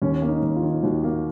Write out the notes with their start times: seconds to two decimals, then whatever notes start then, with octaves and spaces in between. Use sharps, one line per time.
0.02 D#2 C#4
0.22 A#3
0.29 D#4
0.42 D#2
0.56 F4
0.63 D#3
0.83 D#2 F#4
1.04 A#3